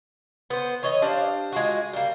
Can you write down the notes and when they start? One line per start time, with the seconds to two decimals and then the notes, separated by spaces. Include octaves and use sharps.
0.50 B3 C5
0.83 E3 C#5 D#5
1.02 D4 G4 C5 F5
1.52 G#3 F4 F#4
1.93 G3 A#3